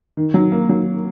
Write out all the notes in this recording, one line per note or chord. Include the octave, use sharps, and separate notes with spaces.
D#3
F#3
A#3
F#3